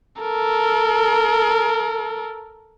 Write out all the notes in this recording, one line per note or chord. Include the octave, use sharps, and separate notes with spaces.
A4 A#4